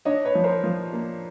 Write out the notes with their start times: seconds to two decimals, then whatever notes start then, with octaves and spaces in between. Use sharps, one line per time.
0.05 D4 C#5 D#5
0.24 B4 C#5
0.35 F3
0.44 A#4 C5
0.64 F3
0.93 A#3